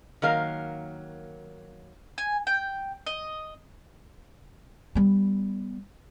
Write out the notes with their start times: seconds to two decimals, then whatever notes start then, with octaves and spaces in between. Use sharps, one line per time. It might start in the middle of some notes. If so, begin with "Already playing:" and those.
0.22 D#3 F#3 A#3 A#4 F5
2.18 G#5
2.47 G5
3.07 D#5
4.95 G3 B3